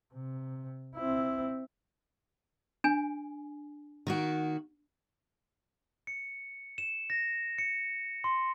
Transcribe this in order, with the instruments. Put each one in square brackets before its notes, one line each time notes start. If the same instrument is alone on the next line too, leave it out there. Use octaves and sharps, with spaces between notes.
[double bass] C3
C4 E4
[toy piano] D4 G#5
[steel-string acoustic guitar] D#3 A#3 F#4
[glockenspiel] C#7
E7
A#6
C#7
C6